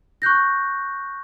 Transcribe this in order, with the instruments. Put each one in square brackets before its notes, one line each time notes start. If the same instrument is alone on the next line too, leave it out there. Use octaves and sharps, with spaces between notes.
[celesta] C#6 F#6 G6 A#6